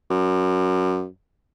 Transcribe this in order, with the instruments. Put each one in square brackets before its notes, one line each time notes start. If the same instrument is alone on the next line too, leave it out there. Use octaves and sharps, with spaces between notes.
[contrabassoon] F#2